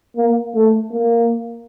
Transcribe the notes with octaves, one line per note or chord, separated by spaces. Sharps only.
A#3
A3
A#3